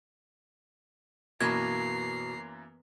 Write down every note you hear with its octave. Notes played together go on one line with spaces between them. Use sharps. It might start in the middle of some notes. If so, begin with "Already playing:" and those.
F#2 B2 E3 A#3 A#5 G#6 C7